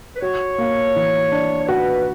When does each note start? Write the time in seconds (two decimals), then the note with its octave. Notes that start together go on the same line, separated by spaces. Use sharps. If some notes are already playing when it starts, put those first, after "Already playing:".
0.16 B4
0.21 F#4 C#5
0.58 A#3
0.96 E3
1.32 D4
1.64 C#5
1.68 F#4 B4